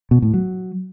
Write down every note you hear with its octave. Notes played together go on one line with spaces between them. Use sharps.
B2
A2
F#3